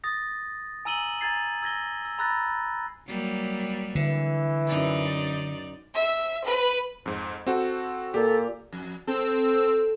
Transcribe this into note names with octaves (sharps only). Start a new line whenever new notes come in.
D#6 A6 A#6
G#5 A#5 E6 D#7 F#7 G7
G#5 A#5 G#6 A6 C7
E6 G#6 A#6 G7
E6
A#5 B5 E6 F#6 A6 A#6
F#3 G3 A#3
D3 E3
F#2 D#4 D5
E5
B4
F2 G#2
C4 F#4 A4
A#2 G4 A4
F2
C4 A4 E6